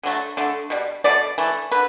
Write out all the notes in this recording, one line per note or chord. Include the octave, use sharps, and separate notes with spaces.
D3 F#3 A3
D3 A3
B2 G3
B2 A3 D5
E3 A3
D3 B4